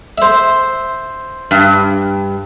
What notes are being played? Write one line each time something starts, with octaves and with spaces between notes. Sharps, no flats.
C5 E5
G2